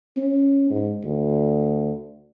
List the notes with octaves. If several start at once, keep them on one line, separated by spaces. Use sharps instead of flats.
C#4
G#2
D2